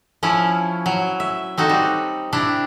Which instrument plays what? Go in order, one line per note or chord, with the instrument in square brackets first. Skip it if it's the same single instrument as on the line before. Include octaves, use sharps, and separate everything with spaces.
[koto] F3 C#4 E4
F#3
E5
C4 D#4 F#4 A4
G3
C3 D4 E4